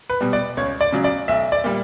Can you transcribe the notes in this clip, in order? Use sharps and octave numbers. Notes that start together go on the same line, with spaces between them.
B4
B2 G3
D5
C#2 C#5
D5
C#3 F#3
D5
B1 E5
D5
A#2 G3